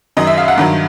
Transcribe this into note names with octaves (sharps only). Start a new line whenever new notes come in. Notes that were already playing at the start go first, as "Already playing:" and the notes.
F#2 D#3 F#3 D#5
E5
F5
F#5
G2 D#3 F#3